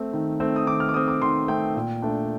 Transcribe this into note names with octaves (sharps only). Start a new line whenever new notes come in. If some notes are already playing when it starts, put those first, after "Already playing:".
Already playing: A3 C4
D#3
A3 C4
D#6
D#3 D6
F6
D6
A3 C4 D#6
D6
D#3 C6
A3 C4 G5
A#2
A3 D4